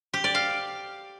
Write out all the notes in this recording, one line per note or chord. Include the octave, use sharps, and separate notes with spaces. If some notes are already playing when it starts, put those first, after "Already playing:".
G4
D5
F5